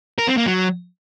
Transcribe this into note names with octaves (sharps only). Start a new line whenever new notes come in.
A#4
C4
A#3
F#3